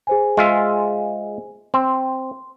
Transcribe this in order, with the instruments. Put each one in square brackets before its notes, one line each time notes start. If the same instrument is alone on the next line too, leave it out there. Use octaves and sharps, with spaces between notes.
[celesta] G#4 C5 G#5
[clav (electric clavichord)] G#3 F4 E5
[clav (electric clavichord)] C4 [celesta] C6